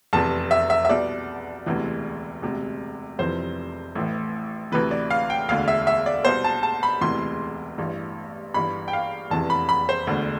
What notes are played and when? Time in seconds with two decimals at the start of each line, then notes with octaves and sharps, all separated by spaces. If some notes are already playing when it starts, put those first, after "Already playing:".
0.13 F1 E2 C3 A5
0.51 E5
0.70 E5
0.85 E5
0.89 C2 B2 D5
1.66 E1 D2 C3 E3
2.42 E1 D2 C3
3.19 F1 F2 C3 E3 C5
3.95 A1 A2 E3
4.72 D2 C3 E3 B4
4.91 D5
5.10 F5
5.30 G5
5.48 E1 D2 D3 F5
5.68 E5
5.87 E5
6.06 D5
6.25 C2 B2 C5
6.44 A5
6.63 A5
6.83 B5
7.01 E1 D2 C3 E3 C6
7.78 A1 G2 E3
8.54 G1 G2 E3 B5
8.88 G5
8.93 F5
9.30 F1 E2 C3 E3 A5
9.50 B5
9.69 B5
9.89 C5
10.07 E1 D2 D3